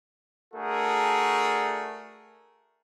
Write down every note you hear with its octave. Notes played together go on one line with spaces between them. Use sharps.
A3 D4 F#4 G#4 A#4